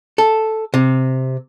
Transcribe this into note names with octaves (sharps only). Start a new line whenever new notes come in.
A4
C3